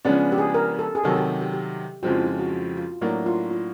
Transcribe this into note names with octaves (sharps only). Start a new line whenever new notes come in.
C#3 F3 G#3 B3 C#4 D4
G4
G#4
A#4
A4
G#4
C3 D#3 F#3 A4
G4
G4
G4
F2 C#3 F3 G#3 C4 F#4
E4
F4
F#4
F#4
F4
A2 F#3 A#3 D4 E4
F4
F4